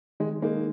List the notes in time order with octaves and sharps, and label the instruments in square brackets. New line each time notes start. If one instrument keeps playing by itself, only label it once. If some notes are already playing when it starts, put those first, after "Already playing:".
[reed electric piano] D#3 [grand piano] G#3
[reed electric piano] G#3 D#4 [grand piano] A#3